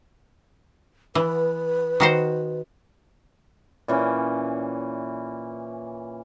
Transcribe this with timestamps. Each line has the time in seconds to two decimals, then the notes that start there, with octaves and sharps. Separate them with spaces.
1.15 E3 B4
2.00 D#3 F#4 C5
3.88 A#2 E3 C#4